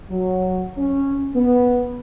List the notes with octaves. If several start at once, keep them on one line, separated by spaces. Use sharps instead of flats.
F#3
C#4
B3